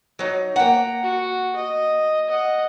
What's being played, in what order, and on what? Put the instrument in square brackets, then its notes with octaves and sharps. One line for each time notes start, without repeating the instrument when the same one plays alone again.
[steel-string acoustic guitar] F#3 D#4
[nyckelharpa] A#3 A#5 [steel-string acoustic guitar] F#5 G5
[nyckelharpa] F#4
D#5
D#5 F#5